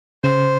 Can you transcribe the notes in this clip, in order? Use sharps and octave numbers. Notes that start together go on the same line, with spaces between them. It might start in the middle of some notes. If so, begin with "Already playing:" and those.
C#3 C5